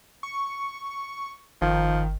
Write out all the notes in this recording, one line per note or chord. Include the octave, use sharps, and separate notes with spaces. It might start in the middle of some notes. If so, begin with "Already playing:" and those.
C#6
G1 D#3 F3